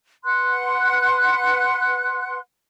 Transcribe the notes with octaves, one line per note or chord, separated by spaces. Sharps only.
B4 F#5 C6 F#6